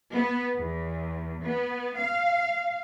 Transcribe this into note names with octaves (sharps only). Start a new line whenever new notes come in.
B3
E2
B3
F5